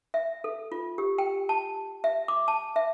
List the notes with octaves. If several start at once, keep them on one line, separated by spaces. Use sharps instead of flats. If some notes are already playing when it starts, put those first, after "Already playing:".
E5
A4
F4
G4
G5
A5
E5
D6
A5
E5